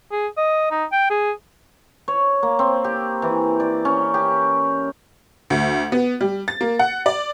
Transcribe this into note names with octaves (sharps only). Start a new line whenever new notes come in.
G#4
D#5
D#4
G5
G#4
C#5
A#3
C4
G4
E3
D5
C#4
G4
D2
B3
G3
A6
A#3
F#5
D5